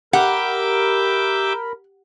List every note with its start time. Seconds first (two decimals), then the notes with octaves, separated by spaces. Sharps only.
0.13 G4 A#4 E5 F#5 G5 B5 D6